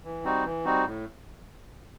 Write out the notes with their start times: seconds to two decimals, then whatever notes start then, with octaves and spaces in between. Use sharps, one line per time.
0.04 E3
0.24 G3 C4 D#4 F#4
0.45 E3
0.65 G3 C4 D#4 F#4
0.85 A2